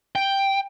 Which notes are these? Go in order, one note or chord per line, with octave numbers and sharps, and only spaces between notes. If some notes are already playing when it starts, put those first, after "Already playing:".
G5